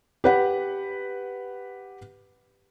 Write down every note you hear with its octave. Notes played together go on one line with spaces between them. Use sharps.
G4 B4 F#5